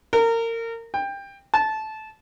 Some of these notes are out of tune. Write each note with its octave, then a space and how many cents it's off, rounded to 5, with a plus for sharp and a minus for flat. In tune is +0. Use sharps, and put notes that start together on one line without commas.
A#4 -25
G5 +20
A5 -15